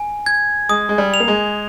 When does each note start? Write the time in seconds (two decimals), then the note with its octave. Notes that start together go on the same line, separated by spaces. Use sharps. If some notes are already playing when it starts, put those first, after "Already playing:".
Already playing: G#5
0.26 G#6
0.69 G#3 D#6
0.89 G#3
0.98 G3
1.14 F7
1.20 A#3
1.28 G#3